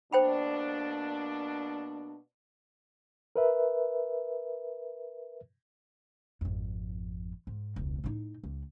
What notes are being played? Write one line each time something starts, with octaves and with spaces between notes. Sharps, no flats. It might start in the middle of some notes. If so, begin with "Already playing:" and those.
B2 A#3 D4 C5 G5 B5
A#4 B4 E5
G#1 F2
G#2
E1 C#2
A2 D#4
C#2